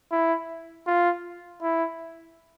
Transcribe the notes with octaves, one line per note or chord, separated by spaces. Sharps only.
E4
F4
E4